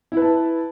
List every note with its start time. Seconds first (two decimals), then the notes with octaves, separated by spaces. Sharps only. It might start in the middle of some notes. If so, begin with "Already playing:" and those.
0.12 E4
0.17 B4
0.22 A5